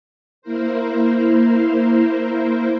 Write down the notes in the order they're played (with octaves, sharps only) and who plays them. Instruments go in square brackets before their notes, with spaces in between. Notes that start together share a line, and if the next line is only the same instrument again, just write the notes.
[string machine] A#3 E4 A#4 C5